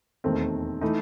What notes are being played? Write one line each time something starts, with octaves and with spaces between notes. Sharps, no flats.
E1 D#2 D#3 A3 C4
E3 A3 D#4